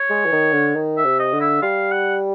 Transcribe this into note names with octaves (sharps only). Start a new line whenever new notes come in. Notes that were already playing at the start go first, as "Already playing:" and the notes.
Already playing: C#5
G#3
E3
D#3
D3
D#3
E5
C3
D#5
D3
E5
G3 F5
F#5